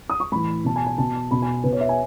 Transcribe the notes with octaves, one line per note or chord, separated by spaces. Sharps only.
D#6
C#6
A2 E3 B5
B2 A5
G#5
G#5
B2 A5
B2 B5
G#5
B2 B4
C#5
E5
G#5